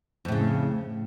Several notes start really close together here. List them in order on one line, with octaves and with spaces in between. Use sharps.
F2 A2 C#3